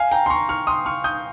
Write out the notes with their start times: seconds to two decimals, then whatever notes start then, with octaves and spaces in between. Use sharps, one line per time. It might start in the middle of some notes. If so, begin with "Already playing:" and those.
Already playing: F5 G#5
0.11 G5 A#5
0.26 C6
0.30 A#5 C#6
0.49 C#6 F6
0.67 C6 D#6
0.86 C#6 F6
1.04 D#6 G6